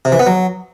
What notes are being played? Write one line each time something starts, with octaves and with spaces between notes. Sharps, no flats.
C3
E3
B3
F#3